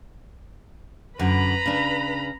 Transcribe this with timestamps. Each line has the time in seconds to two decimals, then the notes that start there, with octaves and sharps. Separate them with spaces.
1.19 F#2 D3 B4 A#5 B5
1.66 C#3 D4